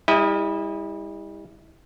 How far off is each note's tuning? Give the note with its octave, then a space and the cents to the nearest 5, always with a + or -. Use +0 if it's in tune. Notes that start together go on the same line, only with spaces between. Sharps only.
G3 +40 E4 -25 D#5 +0